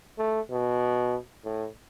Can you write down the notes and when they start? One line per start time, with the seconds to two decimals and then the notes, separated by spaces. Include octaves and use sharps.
0.18 A3
0.51 B2
1.44 A2